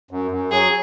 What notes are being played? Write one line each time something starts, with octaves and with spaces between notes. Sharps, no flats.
F#2
F#2
F#3 G#4